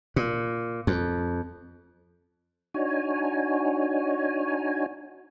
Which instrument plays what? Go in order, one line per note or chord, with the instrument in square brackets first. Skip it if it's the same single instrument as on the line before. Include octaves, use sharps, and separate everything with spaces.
[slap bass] A#2
F2
[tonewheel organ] D4 D#4 F#4 C#5 G#5